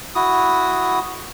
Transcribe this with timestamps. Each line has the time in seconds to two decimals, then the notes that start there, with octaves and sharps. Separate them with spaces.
0.15 E4 F#4 D#6